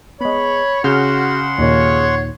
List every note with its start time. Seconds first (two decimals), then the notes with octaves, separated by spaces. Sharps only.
0.21 G#3 B3 C#5 B5
0.84 C#3 F#4 F#5 C6 F6 G6
1.58 D#2 A#2 D#3 C#5